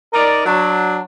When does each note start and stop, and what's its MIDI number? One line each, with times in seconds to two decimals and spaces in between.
0.14 0.42 63
0.14 0.42 70
0.14 0.42 74
0.46 1.00 54
0.46 1.00 62